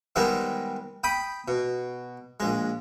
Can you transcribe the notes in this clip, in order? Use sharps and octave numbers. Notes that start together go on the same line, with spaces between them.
D#3 G3 G#3 B3 C4
G5 B5 D#6
B2
A#1 G#3